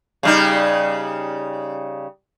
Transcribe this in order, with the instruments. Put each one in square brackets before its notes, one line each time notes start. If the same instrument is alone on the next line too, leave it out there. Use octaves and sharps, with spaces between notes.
[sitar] C#3 G3 D#4